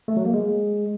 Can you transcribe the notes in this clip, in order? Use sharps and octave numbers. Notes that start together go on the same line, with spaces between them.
A3
F#3
A#3
G#3